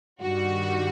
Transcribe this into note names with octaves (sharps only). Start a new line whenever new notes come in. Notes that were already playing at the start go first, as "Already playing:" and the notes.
G2 D#3 G3 F#4